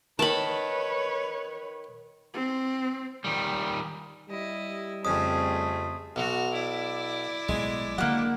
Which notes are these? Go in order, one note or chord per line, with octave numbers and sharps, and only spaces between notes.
D#3 B4 C#5 A5 B5
C4
D#3 G3
G3 E4 D#5
F2 C#3 A3 C4 G#4 D#6
B1 F#4 F6
E4 D5
B1 A2 G#3
D3 F#3 A#3 F#5